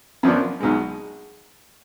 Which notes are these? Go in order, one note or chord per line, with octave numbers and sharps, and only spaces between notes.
F#2 F3 B3 D4
B1 B2 G#3